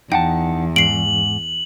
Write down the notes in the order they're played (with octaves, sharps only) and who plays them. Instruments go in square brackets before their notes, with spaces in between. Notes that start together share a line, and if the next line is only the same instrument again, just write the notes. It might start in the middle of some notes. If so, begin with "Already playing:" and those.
[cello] E2 [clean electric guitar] D#4 F#5 A5 [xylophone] G5
[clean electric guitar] G#2 [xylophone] C7 D7 [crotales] F#7